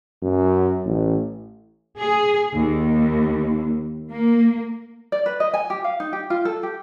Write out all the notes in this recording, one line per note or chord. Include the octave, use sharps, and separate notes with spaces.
F#2
A1
G#4
D#2
A#3
D5
B4
D#5
G#5
G4
F5
D#4
G4
F4
A4
G4